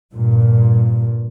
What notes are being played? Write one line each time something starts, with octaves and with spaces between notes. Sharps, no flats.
G2 A#2